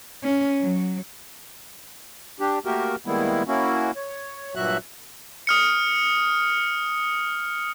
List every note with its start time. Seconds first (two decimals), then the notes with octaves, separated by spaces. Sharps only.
0.24 C#4
0.61 F#3
2.40 D4 G4
2.65 A3 A#3 F#4 G4 A#4
3.06 D#3 G3 G#3 A#3 B3 E4
3.48 A#3 C#4 E4 F#4
3.96 C#5
4.56 G2 A#2 F#3 F#4 E5 F#6
5.47 D#6 F6 C#7